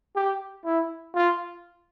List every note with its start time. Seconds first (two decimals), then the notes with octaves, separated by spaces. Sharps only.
0.16 G4
0.65 E4
1.15 F4